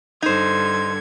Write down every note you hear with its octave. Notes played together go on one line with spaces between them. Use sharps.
G2 D3 D#4 C5 G#6